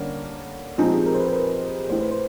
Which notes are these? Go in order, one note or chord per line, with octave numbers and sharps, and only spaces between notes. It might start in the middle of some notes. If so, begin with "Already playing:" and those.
Already playing: D3 G3 A#3 C#4
A#2 F3 G#3 C4 D#4 G#4
G4
G#4
A#4
C5
B4
A#4
B4
A1 A2 E3 C5
B4
C5